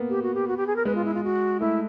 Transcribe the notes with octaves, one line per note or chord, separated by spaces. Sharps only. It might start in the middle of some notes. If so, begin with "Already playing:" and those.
Already playing: A#3 B3
G4
F#4
G4
F#4
G4
G#4
A#4
G#3 B4
F4
E4
F4
F#4
A3 E4